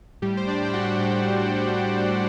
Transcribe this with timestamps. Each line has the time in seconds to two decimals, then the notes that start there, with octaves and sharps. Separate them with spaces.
0.22 A2 G3 G4
0.37 C5
0.48 D4 D5
0.61 A2 G5
0.73 F#4 F#5
0.99 A2 G4 G5